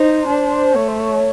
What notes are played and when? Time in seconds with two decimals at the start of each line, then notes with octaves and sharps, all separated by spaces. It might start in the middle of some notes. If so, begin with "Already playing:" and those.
Already playing: D#4 C5
0.28 D4
0.75 A3 C#5
0.88 C5
1.00 C#5